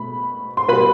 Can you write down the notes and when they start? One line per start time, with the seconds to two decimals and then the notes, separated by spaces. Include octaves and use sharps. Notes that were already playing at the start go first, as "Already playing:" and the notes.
Already playing: B2 A3 B5
0.57 C6
0.69 B2 B4 B5
0.73 G3